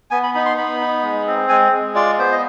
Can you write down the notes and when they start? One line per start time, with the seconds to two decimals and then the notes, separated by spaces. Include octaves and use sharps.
0.11 B3 G#5
0.23 B5
0.35 D#4 B5
0.46 C6
0.57 B3 B5
0.80 D#4
1.03 G#3
1.27 C4
1.49 G#3 G#5
1.72 G#3
1.95 F4 D5
2.18 B3 C5
2.32 D#5